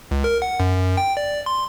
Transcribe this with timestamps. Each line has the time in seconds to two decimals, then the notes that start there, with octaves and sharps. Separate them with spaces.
0.11 C#2
0.24 A#4
0.42 F#5
0.60 F#2
0.97 G5
1.17 D5
1.46 C6